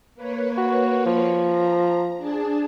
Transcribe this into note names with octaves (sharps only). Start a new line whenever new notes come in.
A#3 B4 C#5
F#4
F3
A#5
D4 G#4 A5